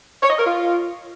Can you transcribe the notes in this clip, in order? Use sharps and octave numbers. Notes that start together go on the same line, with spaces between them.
C#5
D#5
A#4
F4